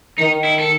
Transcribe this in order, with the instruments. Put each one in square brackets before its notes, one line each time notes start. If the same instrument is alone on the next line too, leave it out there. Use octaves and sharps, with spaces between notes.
[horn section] D#3 [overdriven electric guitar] D#4
[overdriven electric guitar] E4
A4